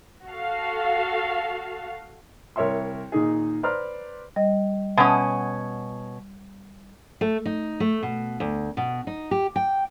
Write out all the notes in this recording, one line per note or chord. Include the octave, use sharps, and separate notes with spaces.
F#4 A4 F5
C2 A#4 C#5 E5 C6
A#2 D#3 D#4 G#4
B4 C5 D5 A#5 C6 F6
G3 D#5
B2 C#4 F#5 G#5 D#6
A3
D#4
A3
B2
D2
B2
D#4
G4
G5